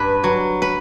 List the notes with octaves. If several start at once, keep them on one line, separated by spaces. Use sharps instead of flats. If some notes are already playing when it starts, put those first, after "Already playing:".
Already playing: G2 B4
F#3
B4